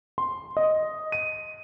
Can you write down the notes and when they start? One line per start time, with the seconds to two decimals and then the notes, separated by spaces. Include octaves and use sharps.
0.18 C6
0.57 D#5
1.12 D#7